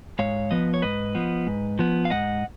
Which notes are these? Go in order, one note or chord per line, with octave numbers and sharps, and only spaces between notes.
G#2 C#5 F5
F3 B3 B4 D#5
C#5
G#2 B4 D#5
F3 B3
G#2
F3 B3
F5
G#2 D#5 F#5